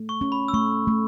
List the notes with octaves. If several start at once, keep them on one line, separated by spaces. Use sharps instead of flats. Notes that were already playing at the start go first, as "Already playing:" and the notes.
Already playing: A3
C#6
C#4
B5
E6
A3 C#6
A3